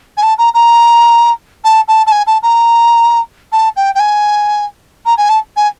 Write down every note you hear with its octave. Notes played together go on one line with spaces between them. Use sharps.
G#5
A5
A#5
A#5
A5
A5
A5
G#5
A5
A#5
A5
G5
G5
G#5
A#5
G#5
A5
G#5